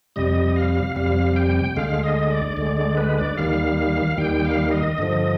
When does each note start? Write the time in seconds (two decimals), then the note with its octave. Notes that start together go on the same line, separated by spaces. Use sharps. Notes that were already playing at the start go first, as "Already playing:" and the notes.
0.16 F2 C3 G3 D#5
0.56 F5
0.96 F2 C3 G3 F5
1.36 G5
1.77 D2 D3 G#3 F5
2.03 D#5
2.30 D5
2.57 D2 D3 G#3 D5
2.77 D5
2.97 B4
3.18 D5
3.37 D#2 D#3 G3 F5
3.77 F5
4.17 D#2 D#3 G3 G5
4.45 F5
4.71 D#5
4.98 G2 D3 F3